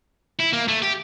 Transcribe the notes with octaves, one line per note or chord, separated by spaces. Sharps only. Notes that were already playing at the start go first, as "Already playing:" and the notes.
E4
A#3
A3
G4